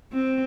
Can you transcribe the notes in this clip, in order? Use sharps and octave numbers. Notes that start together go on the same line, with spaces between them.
C4